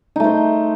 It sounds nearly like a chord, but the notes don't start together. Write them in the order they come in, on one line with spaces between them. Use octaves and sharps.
D#4 A3 C5